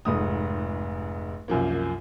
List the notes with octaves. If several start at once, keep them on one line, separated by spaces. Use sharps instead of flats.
F1 G#2 D#6
C2 F#2 F3 A#3